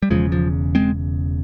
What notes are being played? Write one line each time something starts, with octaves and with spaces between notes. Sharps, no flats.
G3
E1 E2 C#3 F3 G#3
F3
G#3 C4